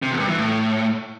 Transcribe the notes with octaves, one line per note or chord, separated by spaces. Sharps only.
C3
E2
G2
E3
A2